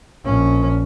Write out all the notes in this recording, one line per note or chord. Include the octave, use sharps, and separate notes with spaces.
A#1 C#4